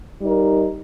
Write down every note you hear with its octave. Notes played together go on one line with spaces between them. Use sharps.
G3 D#4 A#4